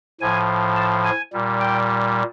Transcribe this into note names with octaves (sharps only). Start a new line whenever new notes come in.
A2 F3 G#5
A5
G#5
A#2 G3
G5